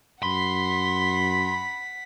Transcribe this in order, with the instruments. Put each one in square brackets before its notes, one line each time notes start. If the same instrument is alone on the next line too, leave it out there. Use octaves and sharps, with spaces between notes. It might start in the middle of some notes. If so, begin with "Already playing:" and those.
[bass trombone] F#2 [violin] F#5 B6 [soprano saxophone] B5 [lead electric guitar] C6